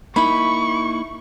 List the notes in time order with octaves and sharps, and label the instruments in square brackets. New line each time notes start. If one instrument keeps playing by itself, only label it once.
[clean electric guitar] A#3 D#4 E4 [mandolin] B5 [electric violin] C#6